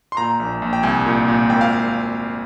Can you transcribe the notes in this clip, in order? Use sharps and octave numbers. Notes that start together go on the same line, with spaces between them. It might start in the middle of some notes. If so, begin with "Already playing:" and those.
C6
A#2 A#5
A#1
A#1
G5
C2 G#5
A#2
A#2
G#1 G5
F5